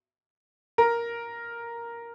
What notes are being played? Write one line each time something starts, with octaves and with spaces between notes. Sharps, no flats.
A#4